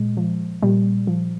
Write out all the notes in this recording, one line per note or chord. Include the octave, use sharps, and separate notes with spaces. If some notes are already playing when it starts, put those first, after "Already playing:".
Already playing: A#2 G#3
F3
A#2 G3
F3